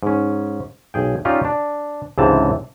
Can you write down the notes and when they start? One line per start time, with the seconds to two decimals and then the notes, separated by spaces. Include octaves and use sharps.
0.03 G#2 C#4
0.94 B1 G#4 G5
1.25 C#4 D#4 F4 G4 D5
1.45 D4
2.18 C#2 G#2 C3 E3 A5